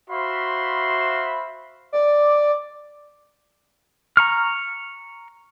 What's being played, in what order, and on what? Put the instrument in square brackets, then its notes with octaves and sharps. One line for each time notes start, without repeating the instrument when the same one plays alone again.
[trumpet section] F#4 C5 E5 F5 B5 C6
[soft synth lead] D5
[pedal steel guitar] A#5 C#6 F6